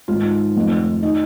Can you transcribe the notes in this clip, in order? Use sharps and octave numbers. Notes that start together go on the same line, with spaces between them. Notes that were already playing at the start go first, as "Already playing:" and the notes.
G#1 G#2 D#3 F4
F1 F2 D#3
D#3 D#4